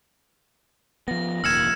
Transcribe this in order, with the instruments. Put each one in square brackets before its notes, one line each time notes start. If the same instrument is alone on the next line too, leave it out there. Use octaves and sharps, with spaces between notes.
[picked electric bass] F3 B3 [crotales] A#6
[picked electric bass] F1 D#2 A#2 [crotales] E6 C#7 E7 [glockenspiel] F6 G#6